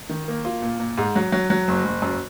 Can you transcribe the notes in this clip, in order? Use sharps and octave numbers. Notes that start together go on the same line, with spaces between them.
D#3
A#3
F4
A#2
A#2
G#2
F#3
F#3
F#3
F#1
F#1
F#2